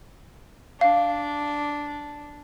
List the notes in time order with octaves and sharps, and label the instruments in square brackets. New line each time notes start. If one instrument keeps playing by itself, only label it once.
[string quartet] D4 [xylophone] F5